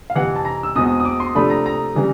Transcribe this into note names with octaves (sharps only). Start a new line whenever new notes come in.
F5
F2 C3 E3 F#5
A5
A#5
E6
E2 B2 G#3 C4 D#6
D#6
D6
C6
C3 F3 A3 D4 B5
A#5
A#5
C#3 E3 G3